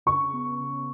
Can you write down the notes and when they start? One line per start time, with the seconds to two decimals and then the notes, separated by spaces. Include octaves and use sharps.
0.06 C#3 C#6
0.33 B3
0.60 C#3